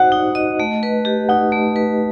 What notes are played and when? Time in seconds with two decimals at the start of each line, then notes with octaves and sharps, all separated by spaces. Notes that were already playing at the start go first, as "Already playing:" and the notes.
Already playing: D#4 F#4 C5 D#5 F#5
0.12 D#4
0.35 D#5
0.60 A3
0.83 B4
1.05 G4
1.29 D#4 F#5
1.52 A3
1.76 B4